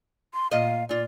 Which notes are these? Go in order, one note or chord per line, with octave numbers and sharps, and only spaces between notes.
C6
A#2 F4 D#5 F5
A#2 F4 D5